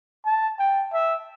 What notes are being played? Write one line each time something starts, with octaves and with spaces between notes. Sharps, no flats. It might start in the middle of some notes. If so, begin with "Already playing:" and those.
A5
G5
E5